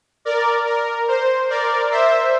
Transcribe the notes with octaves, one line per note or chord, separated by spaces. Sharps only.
A#4 D5
A#4
C5
A#4 D5
C5 E5